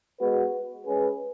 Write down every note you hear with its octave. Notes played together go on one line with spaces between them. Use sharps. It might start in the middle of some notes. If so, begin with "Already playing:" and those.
G#3 B3 F#4 B4
G#3 C#4 G#4 B4